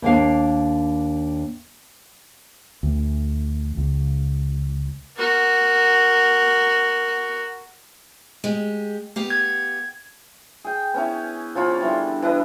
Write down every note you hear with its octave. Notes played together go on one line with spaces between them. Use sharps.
D#2 A#3 D4 F5
D2
C#2
F#4 A#4
G#3 G4
B3 G4 F5
G#6
G#4 G5
B3 C#4 E4
F3 C#4 F4 B5
D3 E3 G3
E3 D4 B4 D#5